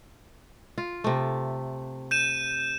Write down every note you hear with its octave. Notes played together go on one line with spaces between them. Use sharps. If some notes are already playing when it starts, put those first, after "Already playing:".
F4
C3 A3
G6 D#7 E7